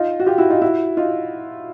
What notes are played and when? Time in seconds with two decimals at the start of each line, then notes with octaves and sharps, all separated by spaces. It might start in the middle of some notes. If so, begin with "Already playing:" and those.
Already playing: D#4 F4
0.20 F#4
0.26 F4 G4
0.38 E4 F#4
0.50 D#4 F4
0.62 E4 F#4
0.97 D#4 F4